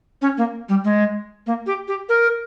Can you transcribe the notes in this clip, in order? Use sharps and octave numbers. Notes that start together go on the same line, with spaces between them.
C#4
A#3
G3
G#3
A#3
G4
G4
A#4